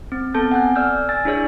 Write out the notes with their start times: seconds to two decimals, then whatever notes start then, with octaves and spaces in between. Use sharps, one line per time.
0.12 C4
0.34 B3 C4 A4 A5 G6
0.52 F#5 G#5 F#6
0.76 D5 E6 F6 G6
1.09 G#5 E6 A6
1.25 D4 E4 G#4 C#5 D5